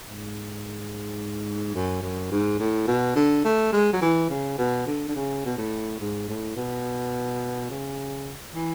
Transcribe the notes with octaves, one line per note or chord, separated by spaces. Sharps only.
G#2
F#2
F#2
G#2
A2
B2
D3
A3
G#3
F#3
E3
C#3
B2
D3
D3
C#3
B2
A2
G#2
A2
B2
C#3
E3